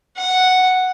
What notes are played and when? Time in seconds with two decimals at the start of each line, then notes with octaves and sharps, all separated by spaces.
0.17 F#5